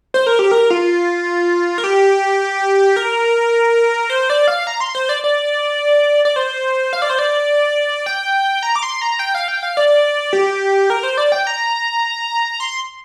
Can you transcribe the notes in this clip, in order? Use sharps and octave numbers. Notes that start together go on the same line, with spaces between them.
C5
A#4
G4
A#4
F4
A#4
G4
A#4
C5
D5
F5
A#5
C6
C5
D5
D5
D5
C5
F5
D5
C5
D5
G5
A#5
D6
C6
A#5
G5
F5
G5
F5
D5
G4
A#4
C5
D5
G5
A#5
C6